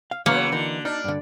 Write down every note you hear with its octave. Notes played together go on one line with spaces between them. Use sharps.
F5
C#3 E3 F#3 A#3 B3 C#5 C#7
D3 E3 D#4 A#4
D4 D#4 F6
G2 D3